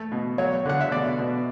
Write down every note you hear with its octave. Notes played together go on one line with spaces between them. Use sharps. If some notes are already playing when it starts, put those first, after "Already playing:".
Already playing: A3
B2
F#3 C#5
D3 F#5
E5
B2 D5
B2